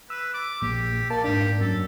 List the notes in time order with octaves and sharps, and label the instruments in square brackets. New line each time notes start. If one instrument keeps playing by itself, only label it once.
[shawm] B4 [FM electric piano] E6
[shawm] D6
[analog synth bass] A#1 [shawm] G4
[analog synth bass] A#3 [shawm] D5 [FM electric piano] A5
[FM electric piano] G#2 D4 [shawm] G4
[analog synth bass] F#2 [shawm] A4